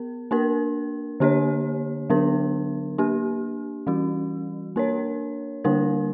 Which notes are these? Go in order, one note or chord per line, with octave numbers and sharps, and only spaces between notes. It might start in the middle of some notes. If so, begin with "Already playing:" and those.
Already playing: B3 A#4
A#3 D4 A#4
D3 A#3 D4 G4 C#5
D3 F#3 B3 D4 A#4
A#3 D4 G4
E3 G3 C#4 F#4
A#3 D4 A#4 C#5
D3 G3 A#3 D4 A#4